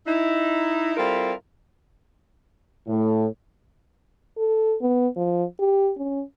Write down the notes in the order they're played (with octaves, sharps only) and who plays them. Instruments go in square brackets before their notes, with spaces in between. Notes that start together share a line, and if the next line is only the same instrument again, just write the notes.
[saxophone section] D#4 E4
G3 C4 E4 F4 A4 A#4
[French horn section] A2
[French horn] A4
B3
F3
G4
C#4